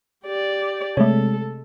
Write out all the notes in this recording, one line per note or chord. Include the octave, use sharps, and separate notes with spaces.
G4 D5
C3 G#3 A3 A4 C#5